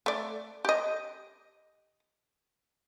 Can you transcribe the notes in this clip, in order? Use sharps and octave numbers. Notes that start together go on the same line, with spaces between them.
A3 D5
G4 D#5